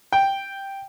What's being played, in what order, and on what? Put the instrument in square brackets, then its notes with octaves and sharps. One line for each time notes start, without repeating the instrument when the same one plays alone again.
[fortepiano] G5